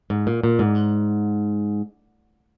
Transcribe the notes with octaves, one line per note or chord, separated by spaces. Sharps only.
G#2
A#2
A#2
G#2